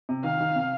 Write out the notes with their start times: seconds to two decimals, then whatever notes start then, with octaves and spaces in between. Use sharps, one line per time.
0.09 C3
0.24 D#3 F5
0.41 D#3
0.55 C3